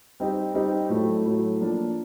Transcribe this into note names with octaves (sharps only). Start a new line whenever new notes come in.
G3 C4 D#4 G4
G3 C4 D#4 G4
A2 F#3 A3
A2 F#3 A3
F3 A#3 D4